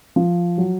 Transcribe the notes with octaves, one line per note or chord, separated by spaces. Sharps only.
F3
F#3